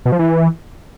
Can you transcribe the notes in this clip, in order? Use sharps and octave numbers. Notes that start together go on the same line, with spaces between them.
B2
F3
E3